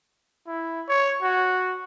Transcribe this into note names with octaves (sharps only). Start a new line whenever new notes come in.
E4
C#5
F#4